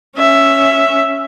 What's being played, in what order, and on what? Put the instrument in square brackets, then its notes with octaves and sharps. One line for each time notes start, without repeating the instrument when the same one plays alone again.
[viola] C#4 E5